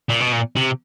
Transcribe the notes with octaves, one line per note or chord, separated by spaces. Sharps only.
A#2
B2
A#2
C3